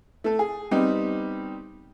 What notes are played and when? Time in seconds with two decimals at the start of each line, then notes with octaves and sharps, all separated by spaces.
0.24 A3 A4
0.39 G#4
0.71 G3 B3 C4 D#4